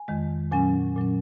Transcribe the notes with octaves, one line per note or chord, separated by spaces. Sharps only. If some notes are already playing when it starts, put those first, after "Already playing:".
Already playing: G#5
F2 D#3 G#3
A#2 F#3 C#4 G#5
A#2 F#3 C#4